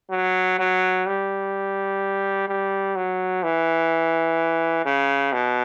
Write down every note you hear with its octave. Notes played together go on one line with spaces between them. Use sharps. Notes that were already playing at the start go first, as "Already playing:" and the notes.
F#3
F#3
G3
G3
F#3
E3
C#3
B2